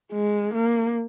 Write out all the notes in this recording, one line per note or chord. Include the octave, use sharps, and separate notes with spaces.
G#3
A#3